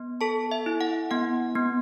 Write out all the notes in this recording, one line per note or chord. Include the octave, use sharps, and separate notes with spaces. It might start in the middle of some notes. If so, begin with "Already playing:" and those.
Already playing: B3
A4 A5
E5
E4
F#5
B3 F#5
B3